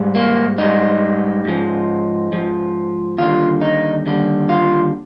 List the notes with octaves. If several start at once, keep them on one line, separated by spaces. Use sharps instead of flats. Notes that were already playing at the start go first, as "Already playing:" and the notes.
Already playing: G#2 G3
A#3
G#2 G3 D#4
G#2 F3
G#2 F3
D#2 D3 G3 F4
D#4
D#2 D3 G3
F4